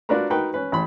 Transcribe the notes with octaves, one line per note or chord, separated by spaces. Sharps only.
D4 F4 F#4 A#4 B4 A#5
D#4 F#4 A#4 B4 G5
C#4 B4
A1 B5